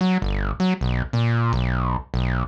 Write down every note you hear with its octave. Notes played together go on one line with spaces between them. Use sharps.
F#3
G1
F#3
B1
A#2
B1
B1